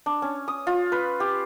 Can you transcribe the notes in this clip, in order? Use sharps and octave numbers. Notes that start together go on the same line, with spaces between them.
D4
C#4
D#6
F4
B4
G4